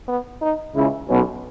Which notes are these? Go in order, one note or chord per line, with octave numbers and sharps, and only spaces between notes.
B3
D#4
C#2 C#3 E4
B1 B2 C#4